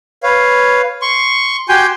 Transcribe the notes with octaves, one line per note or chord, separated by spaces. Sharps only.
B4 C#5 F5
C6 C#6
F#4 G4 G5 G#5 C6 G6